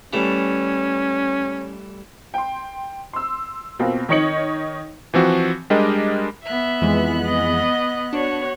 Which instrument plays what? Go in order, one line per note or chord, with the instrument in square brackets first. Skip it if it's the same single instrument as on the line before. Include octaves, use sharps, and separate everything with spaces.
[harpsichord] E3 G3 A3 [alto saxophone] C#4
[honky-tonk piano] G5 C6
C6 E6
B2 A#3 C4 F4
D#3 D#4 C#5 D#5 C#7 F#7
[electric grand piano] E3 F3 C4 F#4
G3 G#3 D4 G4 A#4 D#5
[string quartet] B3 F#6 [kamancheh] E5
[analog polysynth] F2 E3 G#3
[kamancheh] D#5
[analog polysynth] D4 [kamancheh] F#4 C#5